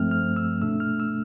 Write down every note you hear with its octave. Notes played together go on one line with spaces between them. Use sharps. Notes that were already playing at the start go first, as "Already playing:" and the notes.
Already playing: G2 F3 A3 C4 F6
F6
E6
B2 A3 D4 E6
F6
E6